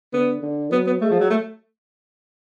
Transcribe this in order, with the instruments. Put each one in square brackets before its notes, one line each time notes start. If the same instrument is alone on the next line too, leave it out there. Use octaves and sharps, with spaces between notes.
[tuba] D3 [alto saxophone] B3
[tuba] D3
[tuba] F#3 [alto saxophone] B3
[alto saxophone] B3
[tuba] G#3 [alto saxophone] A3
[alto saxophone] F3
F#3
A3